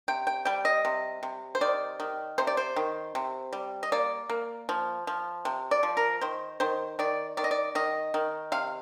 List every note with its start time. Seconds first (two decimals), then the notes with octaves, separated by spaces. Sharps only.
0.08 C3 G5
0.27 G5
0.45 G3 G5
0.65 D#5
0.85 C3
1.23 C3
1.55 C5
1.61 D#3 D5
2.00 D#3
2.38 C3 C5
2.47 D5
2.57 C5
2.76 D#3
3.15 C3
3.53 G3
3.83 D#5
3.92 A#3 D5
4.30 A#3
4.69 F3
5.07 F3
5.45 C3
5.71 D5
5.83 F3
5.97 A#4
6.21 D#3 C5
6.60 D#3 C5
6.99 D#3 D5
7.37 D#3 D5
7.44 D#5
7.51 D5
7.75 D#3 D#5
8.14 D#3
8.52 C3 F5